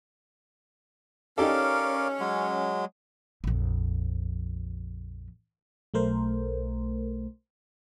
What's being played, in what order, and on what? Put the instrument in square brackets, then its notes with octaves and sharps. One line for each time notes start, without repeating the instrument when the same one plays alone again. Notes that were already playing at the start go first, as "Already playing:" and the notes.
[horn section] C#4 [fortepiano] D#4 G4 A4 [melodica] A#4 D5 F5
[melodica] F#3 G#3
[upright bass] A#1 F2
[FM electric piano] B1 A3 A#4 C5